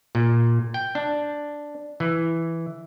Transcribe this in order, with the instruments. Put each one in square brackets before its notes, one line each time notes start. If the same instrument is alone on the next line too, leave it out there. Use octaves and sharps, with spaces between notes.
[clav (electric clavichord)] A#2
G5
D4
E3